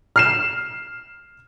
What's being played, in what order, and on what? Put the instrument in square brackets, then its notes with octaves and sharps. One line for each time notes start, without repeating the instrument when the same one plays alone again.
[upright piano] F6 C7 E7